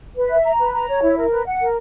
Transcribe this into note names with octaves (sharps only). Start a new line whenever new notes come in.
B4
E5
A#5
B4
A#5
C#5
E4
A#4
B4
F#5
A#4